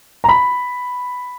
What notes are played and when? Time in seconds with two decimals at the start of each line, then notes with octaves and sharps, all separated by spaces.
0.24 A#5
0.29 B5